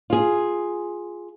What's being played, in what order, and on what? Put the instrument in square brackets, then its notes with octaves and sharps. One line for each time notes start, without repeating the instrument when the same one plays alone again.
[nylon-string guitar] F4 G#4